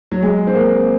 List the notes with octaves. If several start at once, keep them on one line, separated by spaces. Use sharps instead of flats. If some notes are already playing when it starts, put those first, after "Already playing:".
F#3
G#3
C4
A#3